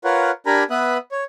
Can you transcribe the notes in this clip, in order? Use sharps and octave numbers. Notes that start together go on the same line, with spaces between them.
F4 A#4 B4 C#5 F#5
D4 G4 A#4 G#5 A#5 B5
B3 B4 E5 B5 D#6 F#6
C#5